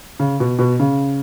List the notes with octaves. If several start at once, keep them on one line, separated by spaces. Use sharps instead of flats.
C#3
B2
B2
C#3